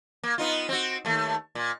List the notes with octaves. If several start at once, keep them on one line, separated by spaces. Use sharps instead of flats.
A#3
B3 D#4 F4
C4 F#4
D#2 A3
A#2